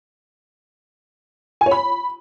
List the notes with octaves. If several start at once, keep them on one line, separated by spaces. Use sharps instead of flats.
G#5
C#5
B5